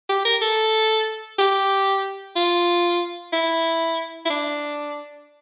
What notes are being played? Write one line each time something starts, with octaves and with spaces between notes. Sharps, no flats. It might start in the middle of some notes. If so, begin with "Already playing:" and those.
G4
A#4
A4
G4
F4
E4
E4
D4